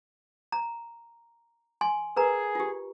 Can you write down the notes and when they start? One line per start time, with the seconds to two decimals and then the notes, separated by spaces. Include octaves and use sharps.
0.52 A#5
1.81 G#5 C6
2.16 G#4 A#4 B4 A#5
2.55 F4 G4